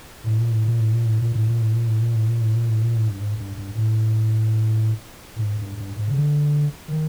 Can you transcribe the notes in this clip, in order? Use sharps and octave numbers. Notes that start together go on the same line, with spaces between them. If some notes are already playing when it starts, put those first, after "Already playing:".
A2
A#2
A2
A#2
A2
A#2
A2
A#2
A2
A#2
A2
A#2
A2
A#2
A2
A#2
A2
A#2
A2
A#2
A2
G2
G#2
G2
G2
A2
A2
G#2
G2
G2
G#2
C#3
D3
D#3